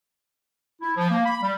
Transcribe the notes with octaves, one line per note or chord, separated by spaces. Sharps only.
E4
F3
A#3
B5
G3